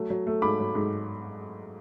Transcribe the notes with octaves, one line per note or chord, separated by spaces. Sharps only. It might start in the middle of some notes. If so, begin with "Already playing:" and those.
Already playing: F#3 A3
F#3
A3
G#2 B5 D6
F#3
G#2